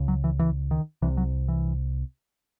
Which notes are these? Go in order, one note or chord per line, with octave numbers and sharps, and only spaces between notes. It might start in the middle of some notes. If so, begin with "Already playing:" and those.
Already playing: C#2 C#3
F#3
E3
E3
D#3
C2 C3 E3
F#3
E3